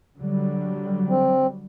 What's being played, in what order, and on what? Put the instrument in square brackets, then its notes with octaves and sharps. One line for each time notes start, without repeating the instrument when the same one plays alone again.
[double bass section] D3 F#3 G3
[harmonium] C4